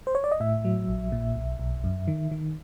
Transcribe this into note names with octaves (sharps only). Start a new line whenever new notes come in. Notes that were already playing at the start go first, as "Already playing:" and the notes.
C5
C#5
D5
D#5
A2 E5
F#3
A#1
A#2
B1
B1
F#2
D#3
D#3